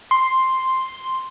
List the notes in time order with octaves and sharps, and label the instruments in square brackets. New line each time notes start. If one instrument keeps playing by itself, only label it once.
[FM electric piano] C6